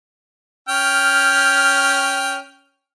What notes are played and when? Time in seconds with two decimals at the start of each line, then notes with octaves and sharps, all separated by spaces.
0.69 C#4 G5 F6